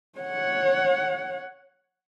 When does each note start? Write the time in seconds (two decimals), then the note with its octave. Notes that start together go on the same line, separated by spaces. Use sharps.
0.19 C#5 F#5